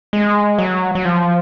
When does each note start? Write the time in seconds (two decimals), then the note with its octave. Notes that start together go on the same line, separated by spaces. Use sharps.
0.13 G#3
0.58 F#3
0.95 F#3
1.05 F3